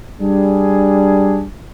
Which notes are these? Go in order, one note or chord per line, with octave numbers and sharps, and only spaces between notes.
G3 D4 G#4